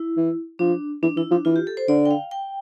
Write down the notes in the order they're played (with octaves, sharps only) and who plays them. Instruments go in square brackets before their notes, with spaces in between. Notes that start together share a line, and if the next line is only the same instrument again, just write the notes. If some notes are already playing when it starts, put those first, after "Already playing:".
Already playing: [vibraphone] E4
[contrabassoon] E3
[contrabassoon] F3 [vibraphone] D4
[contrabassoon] E3 [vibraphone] D4
[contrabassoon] E3 [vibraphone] E4
[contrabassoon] F3 [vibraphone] D4
[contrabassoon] E3 [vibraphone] F4
[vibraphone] G4
A4
C5
[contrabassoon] D3 [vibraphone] D5
[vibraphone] G5
F5
G5